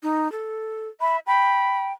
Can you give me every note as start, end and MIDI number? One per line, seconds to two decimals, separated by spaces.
0.03 0.30 63
0.32 0.88 69
1.01 1.19 76
1.01 1.17 83
1.27 1.92 79
1.27 1.81 83